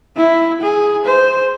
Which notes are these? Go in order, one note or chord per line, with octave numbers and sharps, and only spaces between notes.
E4
G#4
C5